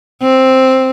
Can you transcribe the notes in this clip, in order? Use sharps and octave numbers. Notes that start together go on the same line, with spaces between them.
C4